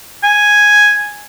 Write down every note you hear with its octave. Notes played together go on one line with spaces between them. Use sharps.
G#5